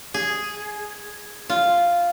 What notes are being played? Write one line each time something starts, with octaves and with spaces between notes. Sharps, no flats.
G#4
F4